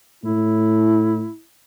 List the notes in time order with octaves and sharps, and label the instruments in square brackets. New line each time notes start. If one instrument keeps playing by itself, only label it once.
[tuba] A2 [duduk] E4